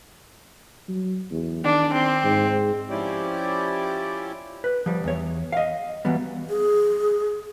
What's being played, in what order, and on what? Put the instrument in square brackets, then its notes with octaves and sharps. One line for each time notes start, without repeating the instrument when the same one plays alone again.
[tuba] F#3
E2
[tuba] D#3 [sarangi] D4
[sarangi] C4
[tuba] G#2
[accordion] F3 C#4 E4 G4 D5
[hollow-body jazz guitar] B4
F3 G3
E2 C#5
D#5 F5
E3 F#3 G3 B3
[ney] G#4